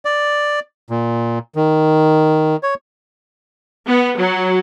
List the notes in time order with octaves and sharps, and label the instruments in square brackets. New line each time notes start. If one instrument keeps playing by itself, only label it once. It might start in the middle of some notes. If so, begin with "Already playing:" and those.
[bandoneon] D5
A#2
D#3
C#5
[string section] B3
F#3